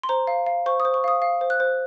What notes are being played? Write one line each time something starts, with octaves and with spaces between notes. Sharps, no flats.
C6
C5 A#5
F5
F5
C5 C#6
D#6
C5
C#6
F5 D#6
F5
C5
F#6
C5